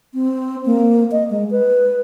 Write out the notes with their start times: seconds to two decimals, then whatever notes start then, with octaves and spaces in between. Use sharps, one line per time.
0.14 C4
0.66 A#3
1.12 D#5
1.30 G#3
1.51 B4